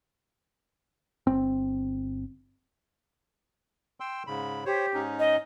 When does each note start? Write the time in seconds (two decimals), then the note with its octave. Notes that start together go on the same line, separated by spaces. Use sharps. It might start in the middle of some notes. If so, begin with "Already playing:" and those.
1.27 G1 C4
4.00 G5 C6 E6
4.27 G#2 C#3 B5
4.66 G4 C5 C#5
4.94 G#2 C#4 D#4
5.19 D#5